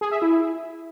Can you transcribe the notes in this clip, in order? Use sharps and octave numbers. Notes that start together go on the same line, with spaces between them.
G#4
E5
E4